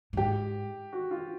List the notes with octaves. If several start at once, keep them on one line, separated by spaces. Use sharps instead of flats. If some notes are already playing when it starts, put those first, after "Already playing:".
A2
G#2 G4
F#4
F4